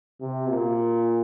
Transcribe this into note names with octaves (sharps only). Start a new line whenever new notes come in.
C3
A#2